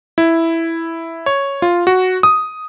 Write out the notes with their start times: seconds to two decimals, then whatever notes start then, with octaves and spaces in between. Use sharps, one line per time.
0.18 E4
1.26 C#5
1.62 F4
1.87 F#4
2.23 D#6